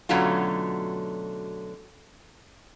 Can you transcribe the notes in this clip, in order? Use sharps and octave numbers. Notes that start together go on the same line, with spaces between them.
B2 D3 F#3 A3 C#4 F4